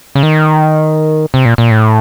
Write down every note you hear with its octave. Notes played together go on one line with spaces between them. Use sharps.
C#3
D#3
C3
A#2
A#2
A2